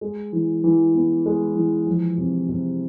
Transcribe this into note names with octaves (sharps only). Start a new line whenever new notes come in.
G#3
E3
E3
B3
G#3
E3
F3
C3
C3